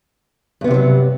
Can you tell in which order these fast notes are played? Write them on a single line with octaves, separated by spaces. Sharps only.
G2 B3 C3 F3 F#3